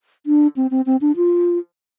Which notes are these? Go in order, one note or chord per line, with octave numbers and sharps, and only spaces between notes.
D4
C4
C4
C4
D4
F4